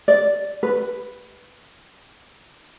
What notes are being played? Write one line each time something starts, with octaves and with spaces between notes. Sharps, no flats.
D5
B4